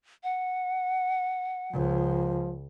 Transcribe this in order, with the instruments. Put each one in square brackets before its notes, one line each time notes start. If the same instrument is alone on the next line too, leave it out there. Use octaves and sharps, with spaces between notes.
[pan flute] F#5
[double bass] C#2 [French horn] F3